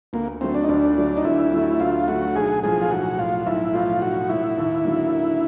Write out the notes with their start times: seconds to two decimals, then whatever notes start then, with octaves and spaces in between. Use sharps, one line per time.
0.13 D2 A#3
0.41 D3 F#3 A3 C4
0.54 D4
0.63 D#4
0.69 D2 D4
0.97 D3 F#3 A3
1.17 D#4
1.25 D2 E4
1.52 D3 F#3 A3
1.80 D2 F4
2.07 D3 F#3 A3 F#4
2.36 B1 G#4
2.63 A2 F3 G#4
2.81 F4
2.91 B1 F#4
3.18 A2 F3 F4
3.47 B1 E4
3.74 A2 F3 F4
4.01 B1 F#4
4.29 A2 F3 E4
4.58 D#2
4.85 D3 F#3 A#3
5.12 D#2